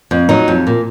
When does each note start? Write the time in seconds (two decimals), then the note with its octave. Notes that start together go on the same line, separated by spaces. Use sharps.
0.11 F2
0.29 F#3 D#4
0.48 F2
0.67 A#2